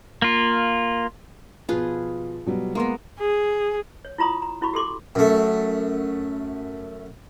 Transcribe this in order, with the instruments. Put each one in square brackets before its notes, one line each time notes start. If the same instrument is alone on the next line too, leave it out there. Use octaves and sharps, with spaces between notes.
[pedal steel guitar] A#3 F4
[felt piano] B2 F3 [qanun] F4 G#4 B4
[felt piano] B2 F#3 G3
[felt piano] G#3 C6 A#6 [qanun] A#3 B3
[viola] G#4
[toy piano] C#5
E4 F4 A#5 C6 D#6
A#5
C#4 E4 F#4 B5 C#6
G4 A4 C6 D6
[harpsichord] F#2 A3